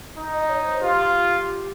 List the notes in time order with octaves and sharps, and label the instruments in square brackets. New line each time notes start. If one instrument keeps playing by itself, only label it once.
[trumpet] D#4
[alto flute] D#5
C#5
C5
[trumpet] F4 [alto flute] G4